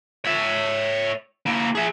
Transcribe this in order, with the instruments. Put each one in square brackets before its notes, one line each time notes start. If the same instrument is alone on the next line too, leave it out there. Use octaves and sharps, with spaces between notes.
[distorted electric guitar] C#5 E5
A#3 E4
G#4 E5